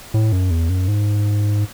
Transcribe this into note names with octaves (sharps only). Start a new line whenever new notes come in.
A2
F#2
E2
F#2
G#2